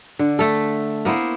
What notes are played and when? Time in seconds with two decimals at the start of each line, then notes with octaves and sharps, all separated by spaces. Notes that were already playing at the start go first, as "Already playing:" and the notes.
0.19 D3
0.39 A3 A4
1.05 A#3 B3 E4 C5